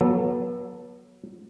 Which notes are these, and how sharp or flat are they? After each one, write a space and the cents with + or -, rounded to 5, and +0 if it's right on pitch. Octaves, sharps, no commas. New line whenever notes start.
F#3 +0 B3 -35 A4 +0